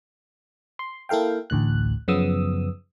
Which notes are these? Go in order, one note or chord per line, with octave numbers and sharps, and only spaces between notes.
C6
A#3 E4 A4 F5 G5
A1 D2 A2 F#6
F#2 C#3 F3 B3 D#6 E6